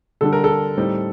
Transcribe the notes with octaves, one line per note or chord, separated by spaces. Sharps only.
D3 G3 D4 A4
A#4
A4
A2 G3 C4 D#4